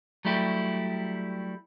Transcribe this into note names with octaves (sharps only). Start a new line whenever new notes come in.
F#3 G3 A3 E4 G4